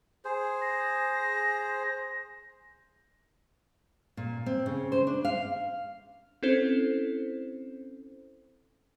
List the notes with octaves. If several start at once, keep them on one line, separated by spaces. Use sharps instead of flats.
G#4 C5
A#6
A#2
C4
C#3
C5
D4
F5
C4 C#4 E4 A4 C5